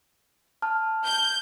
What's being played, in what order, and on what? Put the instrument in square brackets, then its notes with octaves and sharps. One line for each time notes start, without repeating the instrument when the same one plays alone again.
[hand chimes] A5 F6
[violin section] G6